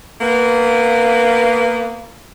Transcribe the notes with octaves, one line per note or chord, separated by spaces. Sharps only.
A#3 B3